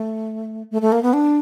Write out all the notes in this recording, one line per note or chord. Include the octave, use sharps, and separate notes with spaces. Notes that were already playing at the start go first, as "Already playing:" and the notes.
Already playing: A3
A3
A3
A#3
B3
D4